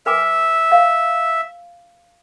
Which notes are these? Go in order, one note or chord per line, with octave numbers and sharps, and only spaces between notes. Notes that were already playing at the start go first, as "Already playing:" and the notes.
B4 E5 G#5 D6
F5